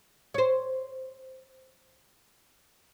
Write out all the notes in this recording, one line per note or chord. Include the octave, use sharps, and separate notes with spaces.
C5 C#5